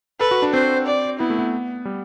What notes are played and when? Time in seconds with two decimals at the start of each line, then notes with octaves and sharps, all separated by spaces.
0.20 A4 B4
0.31 F#4
0.42 D4
0.54 C4 C5
0.87 D5
1.20 B3 E4
1.30 A3
1.39 B3
1.85 G3